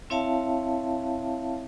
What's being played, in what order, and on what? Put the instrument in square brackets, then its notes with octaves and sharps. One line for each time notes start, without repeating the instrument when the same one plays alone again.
[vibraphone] C4 E4 C#5 E5 F5 A5